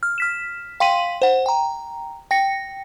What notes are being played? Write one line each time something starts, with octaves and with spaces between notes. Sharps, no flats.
F6
F6 B6 E7
F5 G5 C6 B6 D#7 F#7
C5 F#5
G5 A#5
G5 A#6 C#7